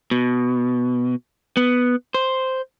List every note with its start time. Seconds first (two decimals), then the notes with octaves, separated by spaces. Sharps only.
0.11 B2
1.57 B3
2.14 C5